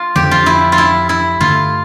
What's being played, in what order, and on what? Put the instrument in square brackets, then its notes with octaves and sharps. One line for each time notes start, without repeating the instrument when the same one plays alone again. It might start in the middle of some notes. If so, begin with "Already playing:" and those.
Already playing: [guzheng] F4
[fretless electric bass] F2 D3 F3 [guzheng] G4
[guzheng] F4
E4
F4
E4
E4
[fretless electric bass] G2 D3 A3 [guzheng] F4